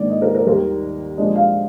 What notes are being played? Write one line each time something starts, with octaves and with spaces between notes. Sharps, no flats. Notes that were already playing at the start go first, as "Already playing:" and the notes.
Already playing: G#2 D#3 A#3 D4 D5
D#5
A#4
A#4
D#2 D#3 G3 A#4
A#2 F3 G#3 D4 D#5
F5